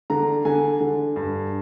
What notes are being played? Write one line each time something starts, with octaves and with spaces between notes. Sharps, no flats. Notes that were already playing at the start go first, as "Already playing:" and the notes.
D3 A#5
D3 G#5
D3
G2